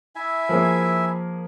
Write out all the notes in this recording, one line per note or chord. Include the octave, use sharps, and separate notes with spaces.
E4 E5 G#5
F3 A#3 G#4